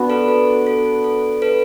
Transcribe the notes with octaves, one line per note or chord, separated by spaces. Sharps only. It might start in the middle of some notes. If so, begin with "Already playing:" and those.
Already playing: B3 D4 F#4
A4 B4
A4
A4
A4
A4 B4